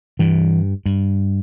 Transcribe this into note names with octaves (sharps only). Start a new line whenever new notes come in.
G2 E3
G2